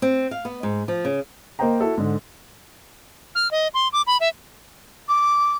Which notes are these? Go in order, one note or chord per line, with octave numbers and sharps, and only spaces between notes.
C4
F5
B3
G#2
F3
C#3
A#3 A#4 C5 D#5 G5 A#5
E4 F#4 A4
G#2 D3
F6
D#5
C6
D6
B5
E5
D6